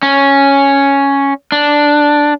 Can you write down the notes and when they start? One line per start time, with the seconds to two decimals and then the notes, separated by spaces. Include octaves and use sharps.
0.03 C#4
1.52 D4